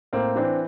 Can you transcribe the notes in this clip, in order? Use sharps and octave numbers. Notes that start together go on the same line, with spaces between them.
A2 A#3 C4
E3 C4 D4